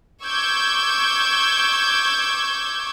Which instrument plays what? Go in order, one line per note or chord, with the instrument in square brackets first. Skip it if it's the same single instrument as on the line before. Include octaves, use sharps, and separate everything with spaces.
[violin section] C#6 D6 E6 G6 G#6